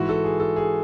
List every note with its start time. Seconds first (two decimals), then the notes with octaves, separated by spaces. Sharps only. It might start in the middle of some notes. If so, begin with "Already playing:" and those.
Already playing: G#2 E3 F#4
0.09 A4
0.24 G#4
0.40 A4
0.56 G#4